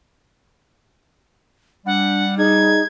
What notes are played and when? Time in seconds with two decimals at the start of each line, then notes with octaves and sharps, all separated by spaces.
1.86 G3 D4 F#5
2.38 D#4 G#4 G#6